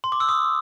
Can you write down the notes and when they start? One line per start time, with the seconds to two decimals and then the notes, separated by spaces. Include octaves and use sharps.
0.04 C6
0.12 D6
0.20 E6
0.29 D#6